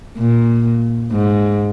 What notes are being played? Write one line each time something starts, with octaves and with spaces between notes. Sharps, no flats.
A#2
G#2